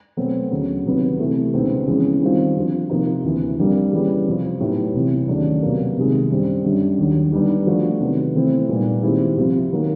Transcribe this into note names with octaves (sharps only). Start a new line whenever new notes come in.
B2 F#3 A3 C4
D2 C#3 F#3
C2 C3 D#3 F#3 B3
C3 E3 A3
C#2 B2 G#3 C4 D#4
F2 C#3 E3 G#3 C#4
D#3 G3 C4 F4
F2 D3 F3
C3 F3 A#3 D#4
D2 C3 E3
F2 D3 G3 A#3
C#3 E3 G3 B3
F2 C3 F3
A2 F#3 B3 D#4 G4
C2 C3 E3
D#2 C#3 F#3 A3 D4
C2 B2 F#3 A#3
C2 C3 D#3 G#3
F#2 D3 G3 C4
F#2 D3 G3
D#2 D3 F#3
D3 G3 B3 D#4
D3 F3 A3 D4 F#4
C3 D#3 F#3 B3
C3 E3 A3 C4 E4
A#2 G3 B3 D#4
D#3 G#3 C4 E4 G4
C2 C3 F3
D#3 F#3 A#3